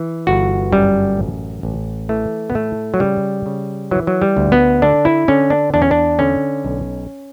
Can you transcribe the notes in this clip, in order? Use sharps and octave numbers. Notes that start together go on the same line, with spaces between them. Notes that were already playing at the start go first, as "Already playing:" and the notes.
Already playing: E3
G1 F#4
F#2 G3
A1
A1
E3 A3
B3
A2 A3
F#3
C#3 G3
C#3
E3 F#3
F#3
G3
D2
B3
D3 D4
E4
D3 C#4
D4
E2 D4
C#4
D4
D3 C#4
B1